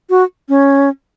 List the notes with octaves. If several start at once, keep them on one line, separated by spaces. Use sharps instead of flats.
F#4
C#4